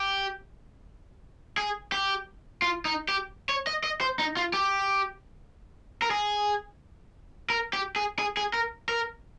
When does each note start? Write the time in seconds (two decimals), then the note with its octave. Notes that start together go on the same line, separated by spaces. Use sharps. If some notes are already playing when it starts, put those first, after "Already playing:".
Already playing: G4
1.58 G#4
1.92 G4
2.62 F4
2.85 D#4
3.09 G4
3.49 C#5
3.67 D#5
3.84 D#5
4.01 C5
4.19 D#4
4.37 F4
4.54 G4
6.02 A#4
6.11 G#4
7.50 A#4
7.73 G4
7.96 G#4
8.19 G#4
8.37 G#4
8.54 A#4
8.89 A#4